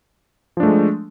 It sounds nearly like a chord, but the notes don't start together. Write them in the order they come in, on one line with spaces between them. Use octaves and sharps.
F3 D4 A3 G#3